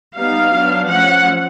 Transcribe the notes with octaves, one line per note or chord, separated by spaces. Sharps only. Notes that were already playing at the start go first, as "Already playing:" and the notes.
G3 B3 D#4 F5
F#3 B3 D4
F3 A3 C#4 F#5